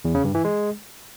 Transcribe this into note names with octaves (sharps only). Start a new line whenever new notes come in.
E2
C#3
G2
E3
G#3